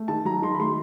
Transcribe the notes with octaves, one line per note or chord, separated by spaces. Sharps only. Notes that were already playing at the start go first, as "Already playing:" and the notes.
Already playing: A3
D#3 A5
F#3 A#5
D#3 C6
B5
A3 C6